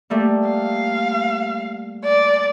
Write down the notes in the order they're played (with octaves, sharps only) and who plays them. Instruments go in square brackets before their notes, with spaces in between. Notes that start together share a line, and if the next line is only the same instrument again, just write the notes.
[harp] G3 A3 A#3
[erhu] F5
D5